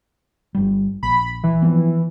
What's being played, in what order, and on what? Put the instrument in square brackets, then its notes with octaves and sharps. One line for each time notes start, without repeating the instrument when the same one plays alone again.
[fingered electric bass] G1 G3
[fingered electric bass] A#1 [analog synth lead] B5
[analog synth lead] E3
[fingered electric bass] F3 B3